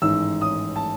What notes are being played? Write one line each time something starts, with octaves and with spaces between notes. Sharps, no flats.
A1 G#2 D#3 E6
D#6
A5